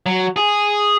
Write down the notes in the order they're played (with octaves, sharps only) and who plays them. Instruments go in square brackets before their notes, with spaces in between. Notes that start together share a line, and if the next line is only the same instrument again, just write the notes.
[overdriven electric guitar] F#3
G#4